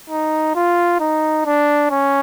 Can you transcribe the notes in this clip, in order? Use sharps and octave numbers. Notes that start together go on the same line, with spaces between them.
D#4
F4
D#4
D4
C#4